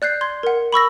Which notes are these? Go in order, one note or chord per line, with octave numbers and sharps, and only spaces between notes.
D5 F#6 G6 C7
C6 G#6
A#4 F#5
B5 C#6 E6 A#6